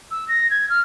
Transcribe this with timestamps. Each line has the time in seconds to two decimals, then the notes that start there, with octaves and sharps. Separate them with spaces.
0.11 E6
0.29 A#6
0.50 G#6
0.70 F6